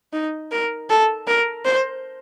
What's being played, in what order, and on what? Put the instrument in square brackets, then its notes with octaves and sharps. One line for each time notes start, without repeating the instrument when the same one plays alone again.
[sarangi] D#4
A#4
A4
A#4
C5